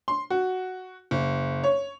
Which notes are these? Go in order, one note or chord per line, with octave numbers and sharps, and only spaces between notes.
C6
F#4
F#1
C#5